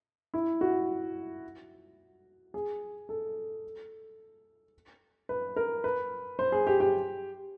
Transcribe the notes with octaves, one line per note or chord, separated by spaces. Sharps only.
E4
F#4
G#4
A4
B4
A#4
B4
C5
G#4
G4
G4